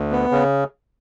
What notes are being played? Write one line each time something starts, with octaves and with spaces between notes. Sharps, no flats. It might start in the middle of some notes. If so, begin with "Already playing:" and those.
Already playing: D2
B3
C#3